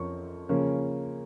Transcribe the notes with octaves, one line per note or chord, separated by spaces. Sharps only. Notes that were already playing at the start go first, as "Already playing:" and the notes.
Already playing: F2 F3 C#4 A#4 C#5 C#6
C#3 F3 A#3 C#4